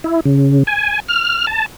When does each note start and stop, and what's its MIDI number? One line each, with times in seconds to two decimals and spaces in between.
0.04 0.20 64
0.26 0.63 49
0.67 1.00 80
1.08 1.46 89
1.47 1.66 81